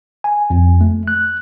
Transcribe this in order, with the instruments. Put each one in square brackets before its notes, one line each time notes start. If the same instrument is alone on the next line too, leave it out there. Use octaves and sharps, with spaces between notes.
[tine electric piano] G#5
F2
A3
F#6